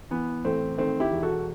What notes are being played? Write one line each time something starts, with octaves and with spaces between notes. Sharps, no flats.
E3 B3
A1 A3 C4
D#3 A3 C4
E4 G4
E1
F#4 A4